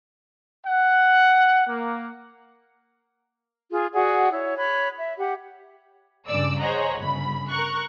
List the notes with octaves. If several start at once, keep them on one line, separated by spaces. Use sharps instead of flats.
F#5
A#3
F4 G#4
F#4 G#4 D5 F#5
E4 C#5
C#5 B5 F#6
E5
G4 F#5
G2 C#3 D5 D6 E6
G#4 C5 C#5 D#5 F#5 A#5
G1 C#3 B5
A#4 C#6 F#6